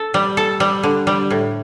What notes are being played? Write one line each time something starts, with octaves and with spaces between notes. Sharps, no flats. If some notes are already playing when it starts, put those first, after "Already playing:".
Already playing: A4
G3
A4
G3
D3
G3
A2